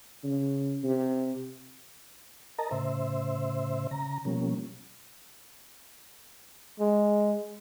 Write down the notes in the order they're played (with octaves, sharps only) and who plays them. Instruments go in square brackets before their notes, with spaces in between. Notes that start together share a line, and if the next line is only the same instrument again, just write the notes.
[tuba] C#3
C3
[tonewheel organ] A#4 D#5 A5 A#5
A2 C#3 C5 E5
C#3 A#5
B2 F3 G3 A#3 C#4
[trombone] G#3